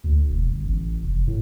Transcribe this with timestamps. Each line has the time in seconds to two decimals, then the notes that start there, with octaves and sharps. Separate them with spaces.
0.04 D2
0.29 E1
0.49 G1
0.64 A1
1.02 F1
1.27 A2